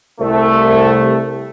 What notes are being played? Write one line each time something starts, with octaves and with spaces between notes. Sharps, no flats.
C2 A3